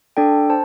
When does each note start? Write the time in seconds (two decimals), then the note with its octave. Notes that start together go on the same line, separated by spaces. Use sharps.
0.17 D4 A4 D5 G5
0.50 C5 A5